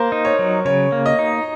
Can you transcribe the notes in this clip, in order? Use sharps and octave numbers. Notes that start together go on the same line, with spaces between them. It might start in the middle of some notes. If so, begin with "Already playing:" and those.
Already playing: A#3 A#4 C5
D#4
C#5
F#3
C#3 C#5
A#3
D#5
D#4